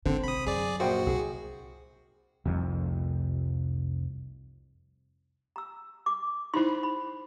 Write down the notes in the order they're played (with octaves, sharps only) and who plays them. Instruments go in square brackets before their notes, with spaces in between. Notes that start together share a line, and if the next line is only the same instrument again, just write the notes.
[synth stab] G#1 [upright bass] G#2 [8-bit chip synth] D3 [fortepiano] C4
[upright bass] C2 [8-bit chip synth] B5 D#6
[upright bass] F#2 [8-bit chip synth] G#4 D5
[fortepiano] A#1 C5 G5 [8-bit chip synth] F#4
[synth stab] C2 [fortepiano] G#4
[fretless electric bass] F1 C2 F2
[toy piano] A#5 E6
D6
[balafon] D#4 E4 [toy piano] C5 B5 C6
[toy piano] B5